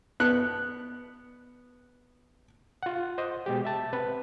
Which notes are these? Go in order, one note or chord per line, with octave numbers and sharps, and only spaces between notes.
B3 F#6
F4 F#5
C5 D#5
B2 G#3 G4
E5 A5
C4 B4